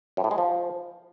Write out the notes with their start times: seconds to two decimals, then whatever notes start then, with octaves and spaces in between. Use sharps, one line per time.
0.17 F#2
0.24 A2
0.31 G#3
0.38 F3